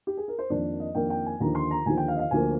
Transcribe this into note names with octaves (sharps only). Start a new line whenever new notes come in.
G4
G#4
A#4
C5
F2 D#3 A#3 D4 D5
D#5
F2 D#3 A#3 D4 G5
G5
G#5
D#2 D3 F3 A#5
C6
A#5
D#2 D3 F3 G#5
G5
F5
D#5
F5
D2 D3 F3 A#3 G#5